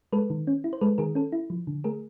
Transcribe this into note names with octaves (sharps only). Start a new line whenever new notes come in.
G#3 A4 B4
D#3
C#4
E4
C5
G#3 A4 B4
D#3 G#4 A#4
C#4 A4
E4
F3
D3
A3 G#4 A#4